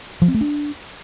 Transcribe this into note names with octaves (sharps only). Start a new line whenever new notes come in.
F3
C4
A3
D4